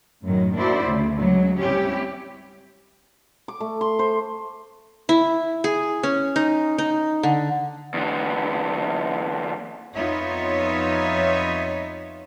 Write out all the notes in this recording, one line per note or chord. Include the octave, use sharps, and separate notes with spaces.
F#2 A2 D#3 F#3
A#3 D4 E4 F#4 C5 D5
D2 C#3
C#3 F#3 G#3
G3 C4 C#4 E4 G4
D6
A3
C6
C5
E4
G#4
C#4
D#4
D#4
D3
E2 D3
F2 B3 D#4 F4 C#5 E5